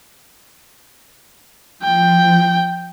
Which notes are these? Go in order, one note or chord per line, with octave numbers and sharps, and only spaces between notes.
F3 G5